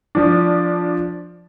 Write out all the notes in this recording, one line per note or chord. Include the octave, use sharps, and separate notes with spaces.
F3 D4